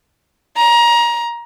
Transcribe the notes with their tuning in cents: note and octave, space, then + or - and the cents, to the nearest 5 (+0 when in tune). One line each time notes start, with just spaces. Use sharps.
A#5 +25